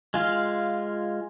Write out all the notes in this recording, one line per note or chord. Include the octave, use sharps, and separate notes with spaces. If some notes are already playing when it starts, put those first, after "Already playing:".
G#3 F4 F5